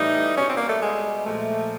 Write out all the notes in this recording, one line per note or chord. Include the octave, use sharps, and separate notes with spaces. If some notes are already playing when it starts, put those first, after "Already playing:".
Already playing: A2 E3 G3 D#4
B2 G3 C#4
C4
A#3
A3
G#3
A#2 F3 G#3 A3